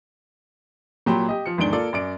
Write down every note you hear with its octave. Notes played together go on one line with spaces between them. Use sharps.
A#2 F#3 G4 G5 B5 C6
G4 D#5
F3 C#7
E2 G#2 D#3 D4 D7 G7
A#3 F4 A4 D5
F#2 D5 D7